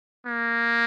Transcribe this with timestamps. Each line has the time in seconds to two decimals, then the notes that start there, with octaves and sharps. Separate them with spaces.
0.26 A#3